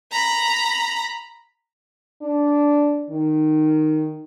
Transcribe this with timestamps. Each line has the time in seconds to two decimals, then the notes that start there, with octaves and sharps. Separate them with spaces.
0.12 A#5 B5
2.22 D4
3.10 D#3